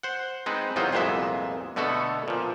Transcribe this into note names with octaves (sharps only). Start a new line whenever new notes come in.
C5 F#5
G#3 C4 D#4 B4
E2 C3 F#3 D#4 F4 C5
C2 F2 A#2 G#3 B3 E5
B2 D3 A3 B3 F#4 A4
A#2 F3